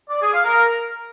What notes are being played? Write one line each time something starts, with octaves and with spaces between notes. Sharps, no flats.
D5
G#4
F5
A#4